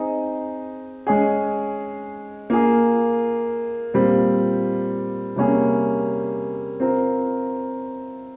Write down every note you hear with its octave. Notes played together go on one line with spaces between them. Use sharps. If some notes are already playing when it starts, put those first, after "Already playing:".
Already playing: C4 D#4 G#4 D#5
G#3 C#4 G#4
A#3 F4 G#4
A#2 G3 C4 F4
C3 G3 A#3 C#4 G#4
C4 F4 A#4